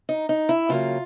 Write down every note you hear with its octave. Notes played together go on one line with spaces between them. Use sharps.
D#4
D#4
E4
C#3 F#3 A#3 F4